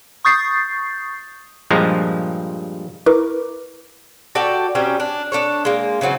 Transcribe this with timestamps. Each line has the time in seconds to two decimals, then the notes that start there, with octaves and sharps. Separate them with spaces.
0.25 C#6 D#6 G6 A6 C7
1.70 G2 A#2 F3 G#3 A#5
3.06 E4 A#4 B4 C#6 D6
4.35 F#4 G4 A4 D5
4.75 F#3 G3 C4 C#4
5.00 D4
5.32 D4 A4 C#5
5.65 G#3 A#3
6.01 C#3 E3 F#3 C4